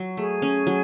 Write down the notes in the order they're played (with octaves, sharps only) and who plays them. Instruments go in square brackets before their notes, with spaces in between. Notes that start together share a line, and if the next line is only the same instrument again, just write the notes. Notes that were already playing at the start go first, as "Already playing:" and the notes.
Already playing: [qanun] F#3
[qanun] A3 [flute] G#4
[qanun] C#4
F#3